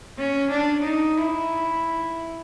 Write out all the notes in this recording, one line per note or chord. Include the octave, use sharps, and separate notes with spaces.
C#4
D4
D#4
E4